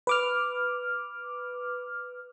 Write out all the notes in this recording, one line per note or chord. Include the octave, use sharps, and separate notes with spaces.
B4 D6 F6